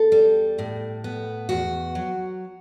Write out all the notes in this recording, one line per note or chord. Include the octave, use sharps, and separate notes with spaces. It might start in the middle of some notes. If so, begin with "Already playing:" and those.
Already playing: E2 A4
G3
A2
B3
E2 F#4
F#3